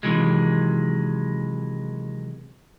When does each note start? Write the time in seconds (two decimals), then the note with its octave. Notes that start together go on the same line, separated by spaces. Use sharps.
0.03 C3 D#3 E3 F#3 G#3